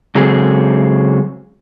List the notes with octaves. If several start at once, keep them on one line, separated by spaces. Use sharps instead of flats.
C#3 F#3 G#3 C4 G#4 A4